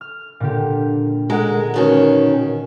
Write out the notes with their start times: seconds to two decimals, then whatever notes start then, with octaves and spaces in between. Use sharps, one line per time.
0.01 F6
0.40 A#2 D3 G4
1.30 G#3 A#4 F#5
1.74 B2 D#3 C#4